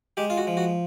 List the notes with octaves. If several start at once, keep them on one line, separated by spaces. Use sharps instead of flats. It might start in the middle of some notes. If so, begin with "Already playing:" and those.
G#3 G4
F4
F#4
F3
F#4